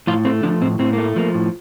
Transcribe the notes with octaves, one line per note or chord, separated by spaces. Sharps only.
A2 F3 F4
A3 C4
D3 F3 D4
A2 C4
A2 C4
A3 A#3
F3 A#3
A2